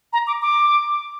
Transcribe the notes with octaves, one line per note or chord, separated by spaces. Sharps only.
A#5
D6
D6